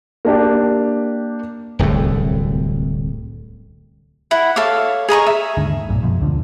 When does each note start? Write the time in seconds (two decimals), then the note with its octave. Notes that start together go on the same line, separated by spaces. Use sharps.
0.25 A#3 D4 G4
1.79 D1 C2 F#2 A3
4.31 E4 F#5
4.56 A4 C#5 F5 D6
5.08 G#4 D#5 A#5 C#6
5.27 E5
5.57 D#2 G#2 D3
5.89 B1 G2 A#2
6.03 F#2 B2 F3 G#3
6.21 D2 D3 F3